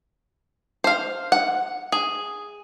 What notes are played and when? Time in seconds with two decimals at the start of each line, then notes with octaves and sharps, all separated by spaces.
0.84 C5 F5
1.32 F#5
1.92 G#4